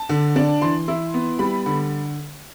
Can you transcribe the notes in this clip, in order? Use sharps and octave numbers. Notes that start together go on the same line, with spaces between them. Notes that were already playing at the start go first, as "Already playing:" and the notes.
Already playing: A5
D3
D4
E3 C6
E4
B3
G3 B5
D3